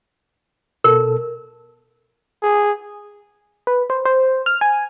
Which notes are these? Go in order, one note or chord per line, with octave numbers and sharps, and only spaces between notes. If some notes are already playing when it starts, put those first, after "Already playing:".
B2 A4 A#4
G#4
B4
C5
C5
F6
G#5